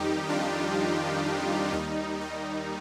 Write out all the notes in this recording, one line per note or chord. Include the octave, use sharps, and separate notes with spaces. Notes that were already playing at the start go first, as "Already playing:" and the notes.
Already playing: F2 D#3 G3 D#4 G4
D4 F4
D#2 D#3 G3 D#4
D#4